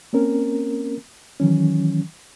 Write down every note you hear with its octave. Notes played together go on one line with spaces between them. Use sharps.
A#3 C4 C#4 A#4
D#3 E3 F#3 C#4